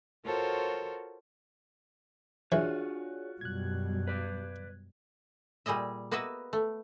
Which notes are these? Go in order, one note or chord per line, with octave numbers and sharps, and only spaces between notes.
F4 F#4 A4 A#4 C5 C#5
E3 D4 F4 F#4 G#4 C#5
F#2 B2 G3 F#6 G#6
B4 D5
A#2 G3 G#4 D#5 E5
A#3 B3 F#4 B4 D#5 E5
A3